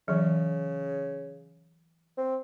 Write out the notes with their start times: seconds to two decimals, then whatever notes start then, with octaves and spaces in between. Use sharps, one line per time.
0.08 C#3 E3 F#3
2.17 C4